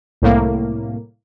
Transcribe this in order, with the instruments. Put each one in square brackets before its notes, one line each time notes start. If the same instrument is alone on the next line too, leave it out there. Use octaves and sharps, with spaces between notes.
[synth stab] C2 A2 A#3